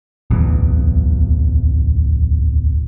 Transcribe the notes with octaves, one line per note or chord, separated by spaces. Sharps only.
D1 B1 E2